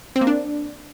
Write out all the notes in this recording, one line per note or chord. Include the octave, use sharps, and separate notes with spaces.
C4
A#3
D4